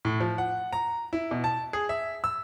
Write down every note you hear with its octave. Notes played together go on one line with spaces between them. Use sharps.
A2
F3
F#5
A#5
E4
B2
A5
G#4
E5
E6